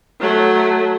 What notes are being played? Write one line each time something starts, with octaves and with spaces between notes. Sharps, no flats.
F#3 A3